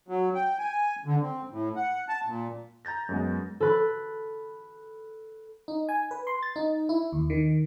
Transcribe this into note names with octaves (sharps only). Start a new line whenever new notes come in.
F#3
G5
G#5
D3
C4
A2
F#5
A5
A#2
A#5 G6 A6 A#6
F#2 G#3 B3
A4 B4
D#4
G#5
B4
C6
A6
D#4
E4
D#2
D#3